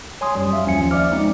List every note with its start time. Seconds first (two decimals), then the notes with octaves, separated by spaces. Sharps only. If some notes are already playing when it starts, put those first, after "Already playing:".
0.21 C#5 G#5 C6 D#6
0.35 F#2 G3
0.53 E5 F5
0.66 D#2 F3 C#4 G#5 C#7
0.91 D5 E5 D6 F6
1.12 G#3 C4 D#4